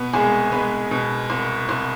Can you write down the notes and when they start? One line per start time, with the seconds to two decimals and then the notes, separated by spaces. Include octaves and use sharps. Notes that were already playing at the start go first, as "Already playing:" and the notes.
Already playing: B2 B3 B4
0.13 C2 G#3 G#4
0.52 G#3 B3 B4
0.91 B2
1.30 C2
1.69 C2